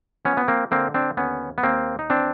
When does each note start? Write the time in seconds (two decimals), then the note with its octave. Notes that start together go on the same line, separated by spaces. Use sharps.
0.25 F3 B3 C#4
0.37 B3
0.48 A#3 C4
0.71 D3 A#3 C4
0.94 C4 D4
1.17 D#2 B3 C#4
1.58 B3
1.63 D#2 A#3 C4
1.99 D#4
2.10 E3 C4 D4